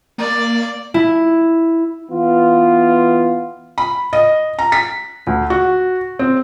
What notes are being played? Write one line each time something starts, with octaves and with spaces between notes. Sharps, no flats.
A#3 D5
E4
E3 B3 F4
B5
D#5
A#5
B6
D2
F#4
C4